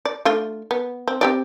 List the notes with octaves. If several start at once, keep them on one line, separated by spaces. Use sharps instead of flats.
D5
A3 D4 F4
B3
C4
C4 G4 D5